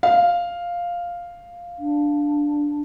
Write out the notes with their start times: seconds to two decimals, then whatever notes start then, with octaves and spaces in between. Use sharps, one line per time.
0.03 F5
1.79 D4